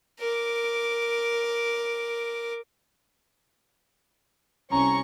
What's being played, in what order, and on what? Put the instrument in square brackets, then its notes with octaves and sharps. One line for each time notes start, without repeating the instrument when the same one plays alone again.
[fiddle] A#4 D6
[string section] C2 C#4 C#6 [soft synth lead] A#5